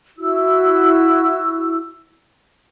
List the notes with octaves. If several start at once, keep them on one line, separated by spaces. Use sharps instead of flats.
E4 F#4 E6